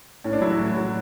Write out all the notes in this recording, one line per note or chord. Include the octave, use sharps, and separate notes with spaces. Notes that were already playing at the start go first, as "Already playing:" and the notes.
A2 C#4
D4
F#3 E4
F#4
A2
F#3